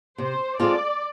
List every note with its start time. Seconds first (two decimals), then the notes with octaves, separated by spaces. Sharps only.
0.18 C3 C5
0.58 G#3 C4 F4 A4 D5